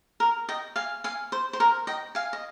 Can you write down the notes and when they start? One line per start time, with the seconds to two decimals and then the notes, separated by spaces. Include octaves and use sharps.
0.20 A#4
0.49 D#5 G5
0.76 F5 G#5
1.04 F5 G#5
1.32 C5
1.53 C5
1.60 A#4
1.87 D#5 G5
2.15 F5 G#5
2.33 D#5